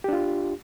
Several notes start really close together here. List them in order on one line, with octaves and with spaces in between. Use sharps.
G4 D4 F4